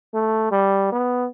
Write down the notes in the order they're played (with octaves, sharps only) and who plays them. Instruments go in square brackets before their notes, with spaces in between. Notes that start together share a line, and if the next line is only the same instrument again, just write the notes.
[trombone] A3
G3
B3